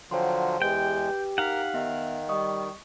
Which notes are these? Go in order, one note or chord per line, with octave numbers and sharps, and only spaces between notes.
D3 F3 F#3 C5 G5 C6
E2 G#3 G4 B4 G5
D#4 A#4 F5 F#5 B6
D#3 B3 E5
G3 D#5 C#6 D#6